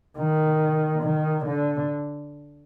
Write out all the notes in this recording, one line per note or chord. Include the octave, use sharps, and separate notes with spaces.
D#3
D#3
D3